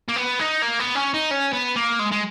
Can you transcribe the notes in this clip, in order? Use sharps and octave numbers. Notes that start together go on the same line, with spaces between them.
A#3
B3
D#4
A#3
B3
C#4
D#4
C#4
B3
A#3
G#3
G#3